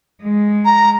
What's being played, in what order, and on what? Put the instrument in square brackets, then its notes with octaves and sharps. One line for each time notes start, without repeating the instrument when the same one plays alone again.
[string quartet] G#3
[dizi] A#5